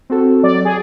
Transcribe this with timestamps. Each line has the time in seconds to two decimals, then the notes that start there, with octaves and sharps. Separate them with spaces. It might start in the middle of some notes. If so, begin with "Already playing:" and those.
0.10 C4 F#4 A4
0.43 F#3 D5
0.65 G#4